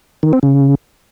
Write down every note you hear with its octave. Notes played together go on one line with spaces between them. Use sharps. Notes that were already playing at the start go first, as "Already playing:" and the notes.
D#3
C4
C#3